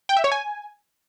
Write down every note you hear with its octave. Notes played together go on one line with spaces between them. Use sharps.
G5
E5
C#5
G#5